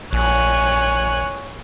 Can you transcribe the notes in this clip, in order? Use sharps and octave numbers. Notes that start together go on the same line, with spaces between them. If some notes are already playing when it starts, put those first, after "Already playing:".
A#1 C#5 G#5 F#6